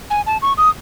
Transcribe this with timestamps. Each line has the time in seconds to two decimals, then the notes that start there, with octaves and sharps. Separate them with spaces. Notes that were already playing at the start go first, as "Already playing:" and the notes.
0.10 G#5
0.26 A5
0.42 C#6
0.57 D#6